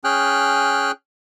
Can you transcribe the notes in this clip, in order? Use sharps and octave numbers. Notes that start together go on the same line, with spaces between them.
C#4 G#4 G5 F6 F#6